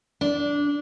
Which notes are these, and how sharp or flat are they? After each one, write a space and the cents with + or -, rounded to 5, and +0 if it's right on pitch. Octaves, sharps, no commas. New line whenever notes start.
D4 -15